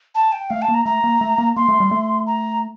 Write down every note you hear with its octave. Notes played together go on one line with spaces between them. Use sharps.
A5
G5
A3 F5
A5
A#3
A#5
A3 A#5
A#3
A3
A#3
A#3 C6
A3
G3
A3
A#5